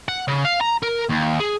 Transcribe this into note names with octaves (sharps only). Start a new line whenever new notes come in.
F#5
C#3
F5
A#5
A#4
D#2
G#4